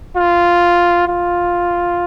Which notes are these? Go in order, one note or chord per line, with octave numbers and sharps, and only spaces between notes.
F4
F4